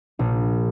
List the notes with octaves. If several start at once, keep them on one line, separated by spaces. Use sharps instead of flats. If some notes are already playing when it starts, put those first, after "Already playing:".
A#1